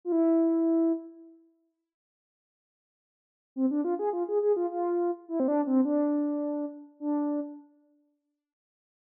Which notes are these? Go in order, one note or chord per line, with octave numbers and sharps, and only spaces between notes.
F4
E4
C4
D4
F4
G#4
F4
G#4
G#4
F4
F4
E4
C4
D4
C4
D4
D4